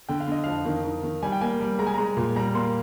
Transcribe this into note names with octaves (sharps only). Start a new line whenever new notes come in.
D3 G5
F5
D3 D#5
F2 F5
D#3
D#3
D#3
G3 G#5
G5
A#3 G#5
G3
G#3 A#5
G#5
G#3 A#5
A#2
G3 A#5
A#3 C6